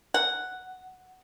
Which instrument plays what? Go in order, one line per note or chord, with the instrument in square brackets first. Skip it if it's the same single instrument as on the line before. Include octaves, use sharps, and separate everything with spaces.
[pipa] F#5